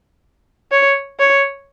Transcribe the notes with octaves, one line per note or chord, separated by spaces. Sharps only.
C#5
C#5